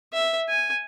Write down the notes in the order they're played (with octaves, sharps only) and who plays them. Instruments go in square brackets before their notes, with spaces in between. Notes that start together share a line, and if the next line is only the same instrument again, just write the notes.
[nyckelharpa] E5
G#5